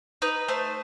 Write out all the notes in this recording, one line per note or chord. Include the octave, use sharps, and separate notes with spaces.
D#4 B4
A3 C5